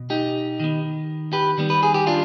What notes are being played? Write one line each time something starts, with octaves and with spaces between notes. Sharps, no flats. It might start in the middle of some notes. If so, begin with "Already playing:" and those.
Already playing: B2
D#4 G4
D#3 B3
G4 B4
D#3 G3 B3
B4
G#4
G4
D4 F4